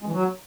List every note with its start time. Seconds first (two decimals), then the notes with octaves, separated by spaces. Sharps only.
0.02 G#3
0.07 E3
0.13 F#3